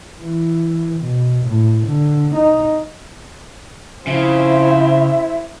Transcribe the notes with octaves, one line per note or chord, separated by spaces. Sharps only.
E3
B2
A2
D3
D#4
C#3 F3 C4 E4 E5